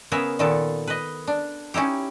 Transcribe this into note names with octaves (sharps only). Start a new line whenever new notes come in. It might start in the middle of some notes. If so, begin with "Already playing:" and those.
C#3 B3 G#4 A#4 E5
A#2 D#3 B3 A4
B4 D#5
D4
C#4 D#4 E4 G4